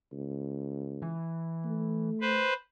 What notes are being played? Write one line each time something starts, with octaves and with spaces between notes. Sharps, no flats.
C#2
E3
A3
B4 C5